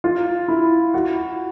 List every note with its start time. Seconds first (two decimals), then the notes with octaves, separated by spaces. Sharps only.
0.04 F4
0.48 E4
0.94 F#4